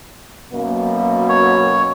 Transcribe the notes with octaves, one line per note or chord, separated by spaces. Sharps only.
F#2 B2 A#3
C#5